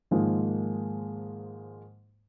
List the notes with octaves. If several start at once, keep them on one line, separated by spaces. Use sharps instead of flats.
G#2 D#3 F3 G#3 A#3